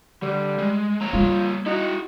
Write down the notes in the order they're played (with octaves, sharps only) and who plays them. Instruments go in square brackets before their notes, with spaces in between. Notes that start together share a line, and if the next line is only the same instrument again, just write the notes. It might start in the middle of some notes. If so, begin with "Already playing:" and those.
[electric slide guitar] D3 [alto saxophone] G3
[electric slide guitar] G#3
A#3 C#5 A#5
[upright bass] G3 [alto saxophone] F4
[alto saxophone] D#4 [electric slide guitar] E4 F#4